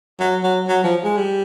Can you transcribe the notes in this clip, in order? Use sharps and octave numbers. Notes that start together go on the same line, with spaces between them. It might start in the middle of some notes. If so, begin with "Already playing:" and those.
F#3
F#3
F#3
F3
G#3
G3